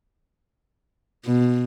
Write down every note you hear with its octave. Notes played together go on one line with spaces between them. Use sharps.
B2